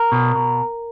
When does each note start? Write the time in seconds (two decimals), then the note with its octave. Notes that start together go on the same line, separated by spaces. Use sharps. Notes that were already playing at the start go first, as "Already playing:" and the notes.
Already playing: A#4
0.12 B2
0.35 B2